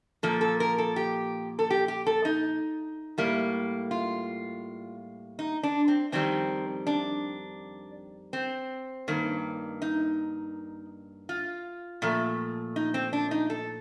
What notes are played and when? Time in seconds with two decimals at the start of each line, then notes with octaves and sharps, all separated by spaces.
0.23 A#2 F3 A#3 A4
0.41 A4
0.60 A#4
0.78 A4
0.96 G4
1.59 A4
1.70 G4
1.88 G4
2.06 A4
2.25 D#4
3.18 A2 G3 A#3
3.91 F4
5.39 D#4
5.63 D4
5.88 C4
6.12 F2 D#3 G3 C4
6.87 D4
8.33 C4
9.08 G2 D#3 A#3
9.82 D#4
11.29 F4
12.02 A#2 F3 A3
12.76 D#4
12.94 C4
13.13 D4
13.31 D#4
13.50 A4